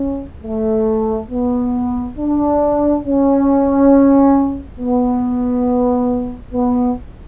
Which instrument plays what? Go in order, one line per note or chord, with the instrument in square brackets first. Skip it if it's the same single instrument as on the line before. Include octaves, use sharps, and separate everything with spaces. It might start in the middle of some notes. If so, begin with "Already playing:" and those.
Already playing: [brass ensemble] C#4
A3
B3
D4
C#4
B3
B3